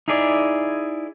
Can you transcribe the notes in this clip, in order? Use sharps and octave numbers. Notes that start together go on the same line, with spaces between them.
D#4 E4 G#4 D5